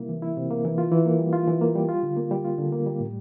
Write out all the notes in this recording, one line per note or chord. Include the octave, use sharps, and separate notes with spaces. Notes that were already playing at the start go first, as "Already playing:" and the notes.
Already playing: C3 G3 A#3 E4
E3
E4
C3
A#3
E3
F4
E3
A#3
G3
F4
E3
A#3
G3
F4
D3
A#3
G3
F4
D3
A#3
G3
A2